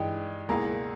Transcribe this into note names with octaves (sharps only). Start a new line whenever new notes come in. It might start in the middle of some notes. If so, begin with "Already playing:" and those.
Already playing: G2 E3 G#3 D#4 G5
C#2 B2 A#3 E4 G#4 A#5